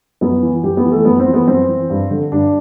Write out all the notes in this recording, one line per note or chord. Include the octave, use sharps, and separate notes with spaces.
F#2 B3
E3
F#2 G4
B3
E3
A3
F#2 B3
C4
E3
B3
F#2 C4
E3
G2
D3
G2 D4